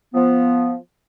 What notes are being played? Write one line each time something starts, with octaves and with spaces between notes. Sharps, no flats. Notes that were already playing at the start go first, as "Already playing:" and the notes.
F3 B3